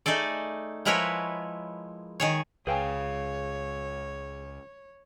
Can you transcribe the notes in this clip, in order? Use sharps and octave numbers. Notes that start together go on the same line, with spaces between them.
A3 D#4 G#4 A4 D5
F3 G#3 E4 A#4 B4 C#5
D#3 G#4 C#5
C#2 G#4 B4 C#5 F5 G5 G#5